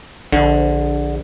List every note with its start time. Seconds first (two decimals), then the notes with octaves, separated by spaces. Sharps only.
0.32 A#1 D3